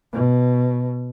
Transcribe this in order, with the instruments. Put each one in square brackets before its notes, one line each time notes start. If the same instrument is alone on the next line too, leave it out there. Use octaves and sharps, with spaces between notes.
[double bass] B2